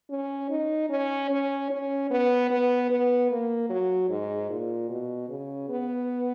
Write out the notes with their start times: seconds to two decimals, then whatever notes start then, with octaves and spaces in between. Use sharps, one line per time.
0.10 C#4
0.50 D#4
0.90 C#4
1.30 C#4
1.70 C#4
2.11 B3
2.50 B3
2.90 B3
3.30 A#3
3.70 F#3
4.09 G#2
4.50 A#2
4.89 B2
5.29 C#3
5.69 B3